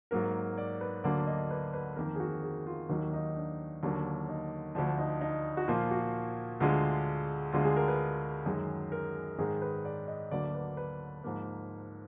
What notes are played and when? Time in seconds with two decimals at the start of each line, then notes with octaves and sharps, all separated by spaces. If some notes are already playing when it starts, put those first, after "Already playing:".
0.11 G#2 F#3 A#3 A#4
0.58 D5
0.81 B4
1.04 D2 D3 F#3 A#3 D5
1.27 D#5
1.51 B4
1.74 B4
1.96 F2 D#3 A#3 A#4
2.15 G#4
2.20 F#4
2.43 G#4
2.67 F4
2.89 D#2 D#3 F#3 A#3 D#4
3.13 D#4
3.36 D4
3.83 D#2 D3 F#3 A#3
4.29 D#4
4.75 D2 D3 F3 D4
4.98 D#4
5.21 D#4
5.57 F#4
5.68 A#2 F3 A#3 F4
5.91 F#4
6.60 D2 D3 G#3 F4
7.53 D2 D3 G#3 F4
7.65 G#4
7.76 A#4
7.88 B4
8.46 F#2 D#3 G#3
8.92 A#4
9.38 G#2 D#3 G#3 G#4
9.62 B4
9.85 D5
10.08 D#5
10.31 D2 D3 F#3 A#3 D5
10.55 B4
10.77 B4
11.24 G#2 F3 A#3